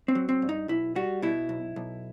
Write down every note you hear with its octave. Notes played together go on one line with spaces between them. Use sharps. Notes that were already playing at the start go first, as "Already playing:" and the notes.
C4
F#3
C4
G2
D#4
B1 E4
G3 F#4
B2 E4
B1
B1